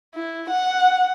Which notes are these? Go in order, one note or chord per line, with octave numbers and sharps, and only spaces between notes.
E4
F#5